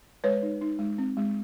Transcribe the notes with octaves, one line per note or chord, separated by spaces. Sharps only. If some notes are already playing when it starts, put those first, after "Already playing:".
G#3 B4 C#5
D#4
D#4
G#3
C4
G#3